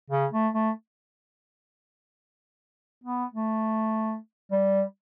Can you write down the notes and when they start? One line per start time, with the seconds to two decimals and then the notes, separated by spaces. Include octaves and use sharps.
0.10 C#3
0.32 A3
0.55 A3
3.04 B3
3.34 A3
4.52 G3